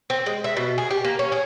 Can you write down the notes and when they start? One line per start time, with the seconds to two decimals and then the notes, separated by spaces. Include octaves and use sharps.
0.10 C4
0.26 G#3
0.44 E5
0.57 B2
0.78 G#4
0.91 G4
1.05 A#3
1.19 C#4
1.32 G#4